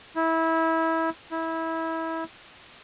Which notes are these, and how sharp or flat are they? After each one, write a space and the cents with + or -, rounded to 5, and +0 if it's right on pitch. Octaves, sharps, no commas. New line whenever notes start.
E4 -20
E4 -20